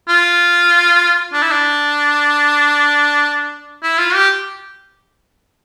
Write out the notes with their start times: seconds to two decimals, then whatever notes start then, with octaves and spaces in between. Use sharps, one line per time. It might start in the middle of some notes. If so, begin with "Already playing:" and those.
0.09 F4
1.33 D4
1.43 E4
1.51 D4
3.83 E4
3.98 F4
4.15 G4